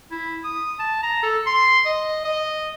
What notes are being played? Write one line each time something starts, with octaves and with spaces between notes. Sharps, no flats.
E4
D#6
A5
A#5
A4
C6
D#5
D#5